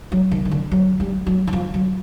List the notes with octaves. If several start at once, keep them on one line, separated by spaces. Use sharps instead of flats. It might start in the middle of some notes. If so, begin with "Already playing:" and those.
F#3
D#3
D#3
D3
F#3
G3
F#3
E3
F3
F#3